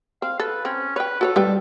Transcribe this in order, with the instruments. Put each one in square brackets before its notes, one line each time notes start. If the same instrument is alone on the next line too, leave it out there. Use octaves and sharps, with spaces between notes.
[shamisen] C4 [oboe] F5
[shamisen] A4 [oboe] B4
[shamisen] C4 [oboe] C#4
[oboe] B4 [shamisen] C#5 G5
[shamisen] F#4 B4 C#5 [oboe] A4
[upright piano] G3 [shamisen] G4 B4 G5